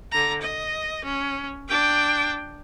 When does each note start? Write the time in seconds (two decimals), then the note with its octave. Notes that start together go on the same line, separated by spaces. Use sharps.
0.12 D3 A#5
0.41 D#5
1.04 C#4
1.68 D4 G5